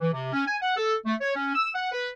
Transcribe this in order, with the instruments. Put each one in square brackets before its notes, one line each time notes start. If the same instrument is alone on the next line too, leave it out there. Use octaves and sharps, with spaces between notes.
[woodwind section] E3
C3
C#4
G#5
F#5
A4
A3
C#5
C#4
E6
F#5
B4